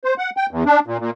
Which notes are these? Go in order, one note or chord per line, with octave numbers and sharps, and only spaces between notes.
C5
F#5
G5
E2
D4
A#2
A#2